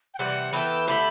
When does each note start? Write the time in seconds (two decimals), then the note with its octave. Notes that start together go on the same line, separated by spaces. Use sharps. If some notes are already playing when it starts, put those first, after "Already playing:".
0.14 G5
0.19 C3 E3 G3 F#5
0.53 E3 B3 E4 A4 G5
0.87 D3 A3 E4 G4 B5